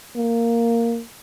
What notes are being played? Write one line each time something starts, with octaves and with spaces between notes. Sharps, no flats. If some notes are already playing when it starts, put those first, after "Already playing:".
A#3